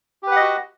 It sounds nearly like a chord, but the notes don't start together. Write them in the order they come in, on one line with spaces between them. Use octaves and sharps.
G4 B4 F#5 D#5 F#4